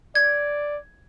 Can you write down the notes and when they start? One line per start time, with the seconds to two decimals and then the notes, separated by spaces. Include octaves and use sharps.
0.15 D5 G#6